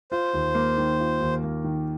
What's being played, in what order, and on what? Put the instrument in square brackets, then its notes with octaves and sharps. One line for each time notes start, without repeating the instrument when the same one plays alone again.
[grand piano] F4 [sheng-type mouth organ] C5
[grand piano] D#2
A#3
D#3
F4
D#2
A#3
D#3